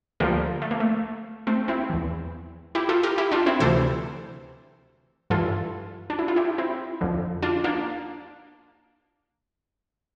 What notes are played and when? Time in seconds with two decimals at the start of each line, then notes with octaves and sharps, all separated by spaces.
0.20 D2 D3 F3 G3 A#3
0.62 A3
0.71 A#3
0.80 A3
1.47 A3 C4
1.68 C4 E4
1.90 E2 E3
2.75 E4 G4
2.89 F4 A4
3.03 G4 A#4
3.18 E4 G4
3.32 D4 F4
3.46 C4 E4
3.60 D2 C3 E3 A4 C5
5.30 G2 E3 F4 A4
6.10 D4
6.19 E4
6.28 F4
6.36 E4 G4
6.58 C4 E4
7.01 F2 D3 F3
7.42 D4 F4
7.64 A#3 D4